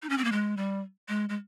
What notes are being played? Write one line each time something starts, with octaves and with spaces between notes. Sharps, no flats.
D#4
C#4
C4
A#3
G#3
G3
G#3
G#3